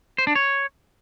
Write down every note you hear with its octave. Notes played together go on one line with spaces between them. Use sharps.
C5
D4
C#5